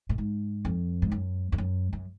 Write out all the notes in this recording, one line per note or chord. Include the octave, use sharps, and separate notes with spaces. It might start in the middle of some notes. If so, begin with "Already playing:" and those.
A2
G#2
F2
G#2
F#2
F2
F#2
F#2